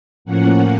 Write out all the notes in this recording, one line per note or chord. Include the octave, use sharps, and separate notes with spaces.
A2 F3 A#3 C#4 F#5